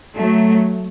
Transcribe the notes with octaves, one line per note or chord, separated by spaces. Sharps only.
F#3 A3